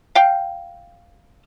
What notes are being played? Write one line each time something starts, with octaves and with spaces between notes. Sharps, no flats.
F5 G5